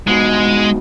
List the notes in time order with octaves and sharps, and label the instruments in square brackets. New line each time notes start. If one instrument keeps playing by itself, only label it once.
[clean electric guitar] G#2 B2 [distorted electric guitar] G#3